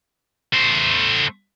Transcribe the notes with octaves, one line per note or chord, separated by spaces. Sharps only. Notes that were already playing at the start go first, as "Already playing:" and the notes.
A3 C5